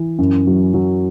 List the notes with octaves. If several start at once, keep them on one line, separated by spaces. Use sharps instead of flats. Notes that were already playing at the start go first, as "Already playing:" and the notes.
Already playing: E3
F#2
F#3
F#3